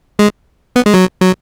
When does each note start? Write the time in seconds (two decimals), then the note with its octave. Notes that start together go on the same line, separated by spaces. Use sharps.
0.19 G#3
0.76 B3
0.86 G#3
0.94 F#3
1.21 F#3